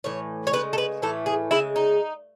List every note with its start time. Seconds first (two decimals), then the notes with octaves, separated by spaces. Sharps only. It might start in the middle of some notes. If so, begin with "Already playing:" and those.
0.04 A2 E3 C#5
0.47 C#5
0.53 C#3 G#3 B4
0.73 A4
0.78 B4
1.02 A2 E3 A3 A4
1.26 G#4
1.51 C#3 G#3 E4
1.76 D#4